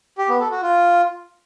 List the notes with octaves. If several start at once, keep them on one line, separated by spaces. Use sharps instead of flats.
G4
B3
A4
F#4
F4